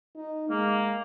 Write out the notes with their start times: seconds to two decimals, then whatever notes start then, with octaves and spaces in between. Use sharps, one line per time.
0.15 D#4
0.50 G#3 A#3